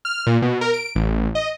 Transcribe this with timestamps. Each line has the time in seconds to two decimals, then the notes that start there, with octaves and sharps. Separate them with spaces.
0.05 F6
0.27 A#2
0.42 B2
0.61 A#4
0.74 D7
0.95 A1
1.35 D#5